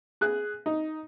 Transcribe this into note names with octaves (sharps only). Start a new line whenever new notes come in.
G#4 F#6
D#4